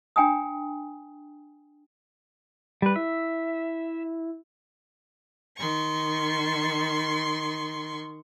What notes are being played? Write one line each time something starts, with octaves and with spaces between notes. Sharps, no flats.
D4 G5 G#5 A#5 D#6
G3 B4
E4 E5
D#3 C6 C#6